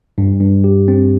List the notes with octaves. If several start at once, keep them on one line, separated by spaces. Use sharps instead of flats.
G2
G2
G4
C4